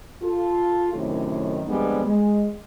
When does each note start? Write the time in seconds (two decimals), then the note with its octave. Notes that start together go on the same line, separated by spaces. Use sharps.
0.22 F4 A4
0.94 F#2 A2 C3 D#3
1.67 F2 D3 G3 G#3 B3
2.04 G#3